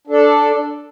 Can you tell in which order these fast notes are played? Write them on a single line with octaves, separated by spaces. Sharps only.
D4 A4 D5